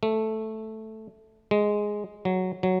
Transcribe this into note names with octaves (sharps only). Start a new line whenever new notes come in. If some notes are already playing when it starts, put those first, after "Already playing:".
A3
G#3
F#3
F#3